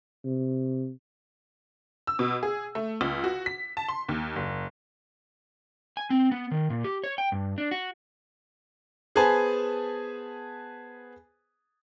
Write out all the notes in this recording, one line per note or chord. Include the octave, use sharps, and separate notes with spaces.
C3
E6
B2
G#4
A3
C#2
F#4
B6
A5
C6
D#2
F#1
G#5
C4
B3
D#3
A#2
G4
C#5
G5
G2
D4
F#4
B3 G#4 B4 C5 G#5 A5